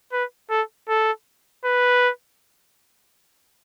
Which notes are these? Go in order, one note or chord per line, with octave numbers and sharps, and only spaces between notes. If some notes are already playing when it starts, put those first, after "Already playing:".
B4
A4
A4
B4